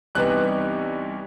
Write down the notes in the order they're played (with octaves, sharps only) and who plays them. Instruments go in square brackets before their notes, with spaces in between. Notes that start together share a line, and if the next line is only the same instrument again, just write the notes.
[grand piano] C2 C3 E3 B3 D#4 F#6